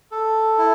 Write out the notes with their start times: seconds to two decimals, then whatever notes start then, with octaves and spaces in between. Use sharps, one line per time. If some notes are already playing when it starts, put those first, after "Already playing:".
0.11 A4
0.58 E4